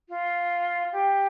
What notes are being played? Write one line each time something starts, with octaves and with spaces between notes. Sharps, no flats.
F4
G4